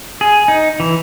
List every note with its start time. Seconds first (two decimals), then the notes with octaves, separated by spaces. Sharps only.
0.21 G#4
0.48 D#4
0.80 E3